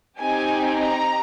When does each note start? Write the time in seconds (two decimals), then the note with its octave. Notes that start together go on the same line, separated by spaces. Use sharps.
0.19 C4 D#4 G4 G#5
0.78 A#5